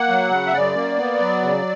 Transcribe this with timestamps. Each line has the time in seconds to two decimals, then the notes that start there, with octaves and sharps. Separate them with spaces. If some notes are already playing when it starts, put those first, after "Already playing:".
Already playing: A#3 F#5
0.09 F#3
0.30 C#3
0.47 E5
0.54 F#2 D5
0.76 A#3
0.98 B3
1.20 F#3
1.42 C#3